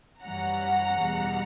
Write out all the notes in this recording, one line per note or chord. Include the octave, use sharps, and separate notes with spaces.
F#2 E3 G3 C#4 F#5 A#5
E2 B2 G3